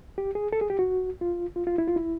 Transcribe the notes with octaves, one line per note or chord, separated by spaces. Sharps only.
G4
G#4
A4
G#4
G4
F#4
F4
F4
F4
E4
F4
E4